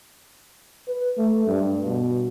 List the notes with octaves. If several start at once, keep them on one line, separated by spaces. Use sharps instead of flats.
B4
A3
G2
B2